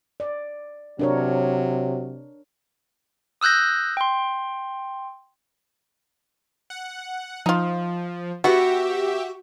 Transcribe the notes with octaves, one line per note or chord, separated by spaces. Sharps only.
D5
C3 F#3 D4 A#4 C#5
D#6 E6 F#6 G6 A#6
G5 C6
F#5
F3 D#4 F4
B3 F#4 G4 E5 F#5